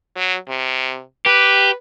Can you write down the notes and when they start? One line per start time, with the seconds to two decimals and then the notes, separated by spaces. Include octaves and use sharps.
0.16 F#3
0.48 C3
1.26 G4 B4